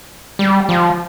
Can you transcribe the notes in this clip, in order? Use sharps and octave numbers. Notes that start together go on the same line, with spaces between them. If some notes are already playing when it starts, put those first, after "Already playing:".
G3
F3